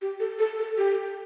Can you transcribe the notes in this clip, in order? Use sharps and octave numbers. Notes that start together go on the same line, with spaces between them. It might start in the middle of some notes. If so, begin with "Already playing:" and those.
G4
A4
A4
A4
G4